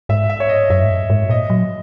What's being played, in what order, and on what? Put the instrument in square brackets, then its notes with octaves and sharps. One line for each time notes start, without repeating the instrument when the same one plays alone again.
[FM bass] G#2 [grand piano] E5
[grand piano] E5
C#5
D#5
[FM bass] F#2 [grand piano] E5
[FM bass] G#2
F#2
G#2
[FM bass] A#2 [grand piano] D#5
[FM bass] F#3